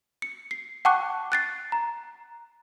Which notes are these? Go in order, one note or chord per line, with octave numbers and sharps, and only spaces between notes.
C#7
C7
F#5 G5 A5 C#6 D6 F#6
F#6 A6 C7
A#5